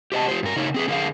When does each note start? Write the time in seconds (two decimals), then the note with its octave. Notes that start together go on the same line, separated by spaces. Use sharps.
0.12 G4 C5 D#5 A5
0.28 F4 G4 C5
0.43 G2 A#4
0.56 C#3 D#4 A#4 C#5
0.74 C4 G#4 B4
0.88 D3 G#4 A#4 E5 F5